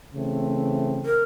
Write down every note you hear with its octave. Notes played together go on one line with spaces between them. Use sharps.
C#3 E3 A3 C4
A#4